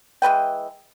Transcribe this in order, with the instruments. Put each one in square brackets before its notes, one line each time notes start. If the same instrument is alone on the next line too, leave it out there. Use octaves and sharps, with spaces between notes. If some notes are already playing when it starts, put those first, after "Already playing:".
[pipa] E3 G#3 B4 G5